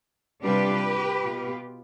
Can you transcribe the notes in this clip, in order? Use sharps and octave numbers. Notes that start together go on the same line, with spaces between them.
C3 G3 D4 F4 G4 B4
B2 B3 F4